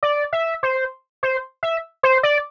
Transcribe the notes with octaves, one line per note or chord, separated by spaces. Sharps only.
D5
E5
C5
C5
E5
C5
D5